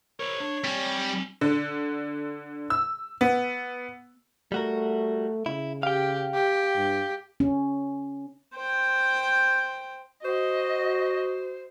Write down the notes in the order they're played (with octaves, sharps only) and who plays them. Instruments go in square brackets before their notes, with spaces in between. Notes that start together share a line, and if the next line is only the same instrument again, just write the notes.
[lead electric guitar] A#4 C5 [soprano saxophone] C#5
[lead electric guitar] D4
[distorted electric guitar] G3 [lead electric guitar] C4 G#5
[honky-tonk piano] D3
E6
B3
[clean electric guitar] G3 F#4 A#4 [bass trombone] A3
[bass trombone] C#3 [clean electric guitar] E4
[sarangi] G4 [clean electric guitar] F5 G5
[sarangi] G4
[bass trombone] G2
[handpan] C#4
[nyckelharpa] C5 G5
[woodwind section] F#4 [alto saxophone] C5 [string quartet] D#5